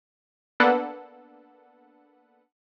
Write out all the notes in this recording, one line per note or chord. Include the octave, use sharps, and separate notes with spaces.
A#3 B3 D4 A4 B4 F#5